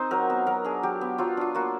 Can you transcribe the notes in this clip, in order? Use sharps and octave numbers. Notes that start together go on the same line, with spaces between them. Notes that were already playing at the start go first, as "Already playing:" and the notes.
Already playing: C4 D#4 C5 D#5
F#3 A#4
B3
F#3 A#4
D4 G#4
F#3 G4
B3
F#3 F4
D4 F4
A#3 F#4